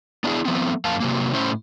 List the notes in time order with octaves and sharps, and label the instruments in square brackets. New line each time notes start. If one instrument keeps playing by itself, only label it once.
[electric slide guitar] B3 D4 E4 G#4
F3 A3 B3 C4
F#2 A#3 F5 A5
C3 F#3 A#3
A2 C#4 E4 C5